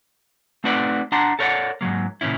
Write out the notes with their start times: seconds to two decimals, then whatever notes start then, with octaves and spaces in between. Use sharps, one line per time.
0.64 A3 C4 D#4 F#4 B4 D5
1.12 D4 F#5 A5 A#5 C6
1.39 A4 A#4 C#5 D5 F5 F#5
1.81 G#2 F3 F#3 A#3
2.21 A#2 C#3 E3 C#4 E4